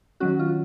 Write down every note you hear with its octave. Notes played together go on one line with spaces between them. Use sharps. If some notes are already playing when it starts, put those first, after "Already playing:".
D#3 F#3 C#4 F#4
F4